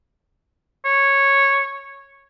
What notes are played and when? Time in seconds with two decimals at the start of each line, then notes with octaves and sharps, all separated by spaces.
0.86 C#5